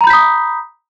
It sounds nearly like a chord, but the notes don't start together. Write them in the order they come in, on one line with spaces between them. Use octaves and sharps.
A#5 B5 G6 B6 D#6